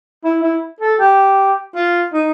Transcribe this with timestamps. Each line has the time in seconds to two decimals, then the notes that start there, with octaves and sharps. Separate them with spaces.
0.24 E4
0.43 E4
0.81 A4
1.00 G4
1.75 F4
2.13 D#4